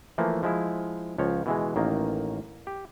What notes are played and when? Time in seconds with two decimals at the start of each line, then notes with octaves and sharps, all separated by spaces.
0.18 E3 F3 A3 A#3
0.43 F3 G#3 E4
1.18 C#2 F3 C#5
1.46 B2 E3 G#3
1.76 A1 D#3 A#3
2.67 G4